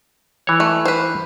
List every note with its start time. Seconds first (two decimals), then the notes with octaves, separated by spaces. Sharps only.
0.47 E3 C#5
0.60 A3
0.85 B4 C5